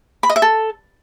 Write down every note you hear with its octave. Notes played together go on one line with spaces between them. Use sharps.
B5
D#5
E5
A4